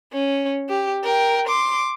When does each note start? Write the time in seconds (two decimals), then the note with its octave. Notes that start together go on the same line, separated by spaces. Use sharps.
0.13 C#4
0.69 G4
1.04 A#4 G5
1.48 C6 D6